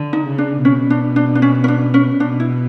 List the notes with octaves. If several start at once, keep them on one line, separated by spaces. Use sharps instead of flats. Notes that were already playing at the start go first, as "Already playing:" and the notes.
Already playing: D3
D#4
C#3
D4
B2 C#4
D4
D4
D4
C#4
C#4
D4
C#4
B2 D4
E4